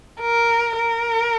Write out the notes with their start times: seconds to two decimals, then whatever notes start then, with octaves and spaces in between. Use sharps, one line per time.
0.21 A#4
0.76 A#4